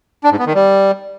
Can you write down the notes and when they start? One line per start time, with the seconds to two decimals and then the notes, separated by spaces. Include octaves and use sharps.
0.24 D4
0.32 G#2
0.39 B3
0.47 D#3
0.54 G3